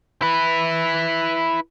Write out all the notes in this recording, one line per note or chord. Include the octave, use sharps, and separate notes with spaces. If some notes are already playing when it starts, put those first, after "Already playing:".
E4 B4